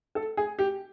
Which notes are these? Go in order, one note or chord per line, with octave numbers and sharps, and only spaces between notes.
A4
G#4
G4